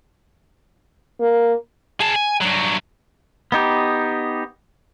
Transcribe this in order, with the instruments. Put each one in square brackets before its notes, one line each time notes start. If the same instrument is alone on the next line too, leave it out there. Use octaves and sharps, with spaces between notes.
[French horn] A#3
[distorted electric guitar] G#4 A5
G#5
G2 F#3
[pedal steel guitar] B3 D#4 G4